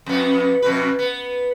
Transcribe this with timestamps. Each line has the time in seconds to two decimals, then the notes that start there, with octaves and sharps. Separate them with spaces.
0.06 F2 B3
0.62 F2 B2 B4
0.99 B3